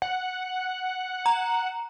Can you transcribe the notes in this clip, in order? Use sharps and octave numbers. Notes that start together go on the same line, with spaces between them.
F#5
A#5